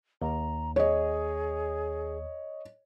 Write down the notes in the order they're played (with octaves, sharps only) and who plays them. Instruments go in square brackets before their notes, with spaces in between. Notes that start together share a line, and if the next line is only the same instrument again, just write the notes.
[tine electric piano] D#2 [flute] A#5
[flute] G#4 [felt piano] C#5 D#5